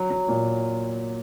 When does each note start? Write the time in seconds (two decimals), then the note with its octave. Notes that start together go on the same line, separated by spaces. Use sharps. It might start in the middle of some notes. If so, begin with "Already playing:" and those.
Already playing: F#3
0.10 F#3
0.29 A#2